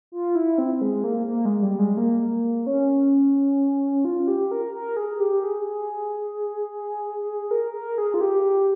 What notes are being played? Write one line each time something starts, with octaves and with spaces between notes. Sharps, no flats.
F4
E4
C4
G#3
A#3
A#3
G#3
G3
G#3
A#3
C#4
F4
G4
A#4
A#4
G#4
G4
G#4
A#4
A#4
G#4
F4
G4